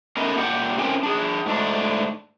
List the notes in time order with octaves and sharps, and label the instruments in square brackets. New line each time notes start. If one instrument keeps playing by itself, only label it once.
[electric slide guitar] A3 B3 C#4 A#4 D#5
A#2 G4 F#5
A3 C4 C#4 A#4 G5 G#5
D4 G#4
G#2 A3 D4